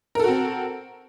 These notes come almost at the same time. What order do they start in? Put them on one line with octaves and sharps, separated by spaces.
A#4 A4 F#4 C4